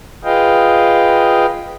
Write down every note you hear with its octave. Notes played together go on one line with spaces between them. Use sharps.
F4 G#4 B4 D#5 F5 G5